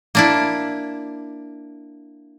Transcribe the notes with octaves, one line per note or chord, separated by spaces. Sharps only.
A#3 D4 E4